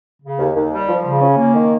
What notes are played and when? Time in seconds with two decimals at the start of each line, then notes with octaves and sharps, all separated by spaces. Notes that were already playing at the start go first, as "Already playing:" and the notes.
0.22 C#3
0.39 D#2
0.55 D#2
0.71 G3
0.89 F3
1.04 C#3
1.21 C#4
1.37 A#3
1.54 D#3